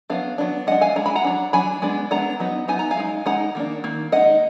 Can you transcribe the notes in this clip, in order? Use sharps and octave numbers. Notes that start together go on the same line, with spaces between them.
F#3 B3 D4 F5
F#3 B3 D4
G#3 D4 D#5 F#5
F5 G#5
G#3 D4 A#5
B5
F#5 A#5
F#3 D4
F#3 D4 G#5 B5
G#3 B3 D4
G#3 B3 D4 F#5 A#5
F#3 B3 D#4
F#3 B3 D#4 G#5
A#5
F5 G#5
G#3 D#4
G#3 D#4 F#5 A#5
D#3 A#3 D4
D#3 A#3
G#3 D#4 D#5 F#5